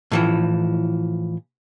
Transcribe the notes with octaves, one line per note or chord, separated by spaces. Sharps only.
A2 E3 F3